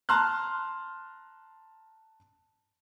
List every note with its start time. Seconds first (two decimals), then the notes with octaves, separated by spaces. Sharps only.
0.09 A5 A#5 C6 F6 F#6